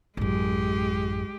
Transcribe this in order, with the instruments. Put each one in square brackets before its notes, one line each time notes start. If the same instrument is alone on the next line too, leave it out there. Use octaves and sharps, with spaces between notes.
[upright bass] A1 F#2 [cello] G#3 G4